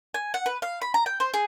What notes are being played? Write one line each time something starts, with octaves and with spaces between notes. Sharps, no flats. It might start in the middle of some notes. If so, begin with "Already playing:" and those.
G#5
F#5
B4
F5
B5
A#5
G5
C5
G#4